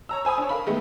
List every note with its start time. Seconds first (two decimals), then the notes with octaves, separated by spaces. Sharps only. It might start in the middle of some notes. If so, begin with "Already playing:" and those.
0.09 C#5 A#5 E6
0.25 C5 G#5 B5 D#6
0.38 D4 C#5
0.49 A#4 F5 B5
0.67 D#3 G#3 A3 B3